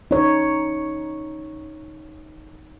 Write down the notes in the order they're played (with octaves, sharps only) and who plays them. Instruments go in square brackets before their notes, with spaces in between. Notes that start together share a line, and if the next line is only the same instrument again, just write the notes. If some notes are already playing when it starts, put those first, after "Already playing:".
[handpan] D#4 C#5